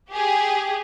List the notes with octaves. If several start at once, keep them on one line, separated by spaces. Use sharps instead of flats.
G4 G#4